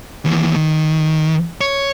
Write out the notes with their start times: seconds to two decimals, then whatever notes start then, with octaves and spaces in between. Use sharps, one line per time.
0.25 D#2 E3
0.56 D#3
1.61 C#5